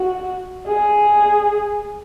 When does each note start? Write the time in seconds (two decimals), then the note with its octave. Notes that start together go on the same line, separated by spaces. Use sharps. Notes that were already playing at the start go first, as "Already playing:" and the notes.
Already playing: F#4
0.67 G#4